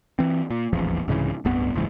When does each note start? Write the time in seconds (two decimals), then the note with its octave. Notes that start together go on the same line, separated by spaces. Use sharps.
0.19 E3 C4
0.50 A#2
0.73 D#1 A1 E2 F3
1.08 C2 G#2 C#3 E3
1.45 D1 C2 G2 B3
1.74 F#1 C#2 G#2 E3